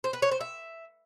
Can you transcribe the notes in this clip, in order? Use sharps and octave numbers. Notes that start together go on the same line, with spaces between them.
C5
B4
C#5
C5
E5